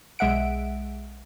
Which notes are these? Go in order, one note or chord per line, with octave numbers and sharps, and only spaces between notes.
B1 G#3 E5 F#5 D7